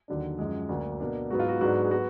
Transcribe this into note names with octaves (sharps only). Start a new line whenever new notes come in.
D#2 D3 F#3 D4
F#2 F3 G#3
D2 D3 F#3 A#3
B2 A#3 D4
G#2 F#3 B3 F#4
F4
F#4
G#2 F#3 B3 D4 F#4
G#4
F#3 B3 F#4